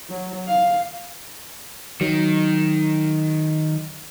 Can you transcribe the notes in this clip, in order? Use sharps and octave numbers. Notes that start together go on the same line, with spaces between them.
F#3
F5
D#3 F#3